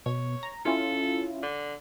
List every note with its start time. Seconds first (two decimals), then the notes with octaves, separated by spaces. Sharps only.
0.06 B2 C#5
0.43 A#5
0.65 C#4 E4 F4 A4
1.43 D3